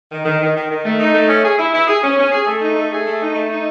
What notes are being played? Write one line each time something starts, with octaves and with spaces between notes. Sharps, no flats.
D#3
D#3
D#3
D#3
D#3
A3
D#4
A3
C#4
G#4
E4
E4
G#4
C#4
C#4
G#4
A3
D#4
A3
G#4
A3
D#4
A3
D#4